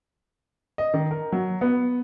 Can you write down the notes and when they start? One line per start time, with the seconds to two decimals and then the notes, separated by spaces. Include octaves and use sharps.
0.78 D#5
0.94 D#3
1.11 A#4
1.32 F#3
1.61 B3